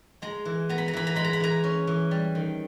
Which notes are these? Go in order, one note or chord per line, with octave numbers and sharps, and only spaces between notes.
G#3 A#5
E3
B3 A#5
B5
A#5
E3 B5
A#5
G#3 B5
A#5
B5
E3 A#5
C#4
E3
G3
D#3